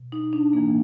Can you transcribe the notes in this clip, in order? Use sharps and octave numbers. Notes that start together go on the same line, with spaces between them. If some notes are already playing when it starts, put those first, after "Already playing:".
Already playing: B2
D#4
D4
A2 E3 A#3